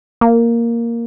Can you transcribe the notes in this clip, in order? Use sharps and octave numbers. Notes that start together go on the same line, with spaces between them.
A#3